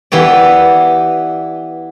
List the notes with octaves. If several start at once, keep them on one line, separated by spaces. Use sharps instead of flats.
E3 B3 G4 D5